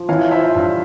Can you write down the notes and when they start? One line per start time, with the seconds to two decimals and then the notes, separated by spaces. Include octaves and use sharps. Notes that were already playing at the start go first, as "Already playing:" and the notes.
Already playing: F3
0.09 E3 C#5 F5
0.31 F4 C5 E5
0.55 G2